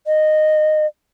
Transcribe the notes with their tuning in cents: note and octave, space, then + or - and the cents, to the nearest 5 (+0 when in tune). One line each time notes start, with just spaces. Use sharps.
D#5 -15